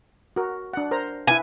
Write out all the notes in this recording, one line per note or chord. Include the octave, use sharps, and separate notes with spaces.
F#4 A#4
D4 F#5
A#4 C5 A#5
E4 B4 G#5